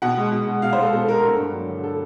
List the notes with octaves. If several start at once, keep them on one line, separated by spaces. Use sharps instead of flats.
B2 F#5
G#3
B2
G#3
B2 F5
C5
G#3 A4
B2 A4
G#3 A#4
G2 A4
G2
F#3
D3
A4